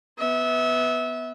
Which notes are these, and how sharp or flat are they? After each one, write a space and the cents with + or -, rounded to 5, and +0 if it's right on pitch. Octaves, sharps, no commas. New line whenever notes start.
B3 +0 E5 -25